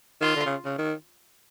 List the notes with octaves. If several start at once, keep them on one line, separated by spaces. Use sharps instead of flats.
D#3 F4
D3
C#3
C#3
D#3